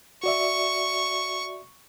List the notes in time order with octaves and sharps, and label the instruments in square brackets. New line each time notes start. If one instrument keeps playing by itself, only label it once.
[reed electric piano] F#4 D5 E5 [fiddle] C#6